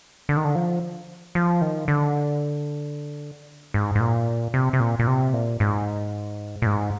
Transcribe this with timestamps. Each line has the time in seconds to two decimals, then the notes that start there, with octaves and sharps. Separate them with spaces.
0.29 D3
0.37 D#3
0.45 D3
0.55 F3
1.35 F3
1.61 D#3
1.88 D3
3.74 G#2
3.95 G#2
4.00 A#2
4.54 C3
4.73 C3
4.80 A#2
4.99 A#2
5.07 C3
5.33 A#2
5.60 G#2
6.62 A#2
6.66 G#2